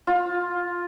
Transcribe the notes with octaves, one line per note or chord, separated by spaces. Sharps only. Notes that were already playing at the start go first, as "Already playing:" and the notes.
F4